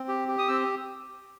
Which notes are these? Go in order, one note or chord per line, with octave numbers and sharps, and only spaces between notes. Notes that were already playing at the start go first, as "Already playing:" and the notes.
Already playing: C4
G4
G4
D#6
C4 E6